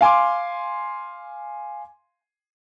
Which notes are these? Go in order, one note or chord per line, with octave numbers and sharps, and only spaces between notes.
F5 G#5 C6 D6